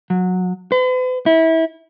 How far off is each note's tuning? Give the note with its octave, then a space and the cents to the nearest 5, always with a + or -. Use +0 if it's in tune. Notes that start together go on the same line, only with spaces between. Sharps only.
F#3 -20
B4 +45
E4 -25